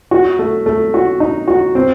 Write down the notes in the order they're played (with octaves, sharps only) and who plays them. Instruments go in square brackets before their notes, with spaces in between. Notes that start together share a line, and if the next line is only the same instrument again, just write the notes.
[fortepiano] F#4
A3
A3
F#4
D#4
F#4
C4